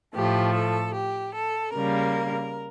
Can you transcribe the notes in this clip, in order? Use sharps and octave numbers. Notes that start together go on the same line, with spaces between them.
A2 F3 A3 G4
A4
G4
A4
C#3 G3 A#3 A#4